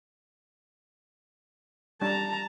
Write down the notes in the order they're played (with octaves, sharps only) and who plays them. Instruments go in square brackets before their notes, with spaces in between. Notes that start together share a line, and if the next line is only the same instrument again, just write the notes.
[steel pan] G3 D4 [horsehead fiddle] A5 A#5